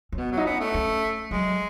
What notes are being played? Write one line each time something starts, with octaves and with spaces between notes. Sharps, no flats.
C#4
B2 B3
F#3
D#4
B3 C#4
A3
C#4
F#3 G#3